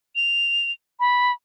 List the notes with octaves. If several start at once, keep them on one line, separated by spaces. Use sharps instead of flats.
F7
B5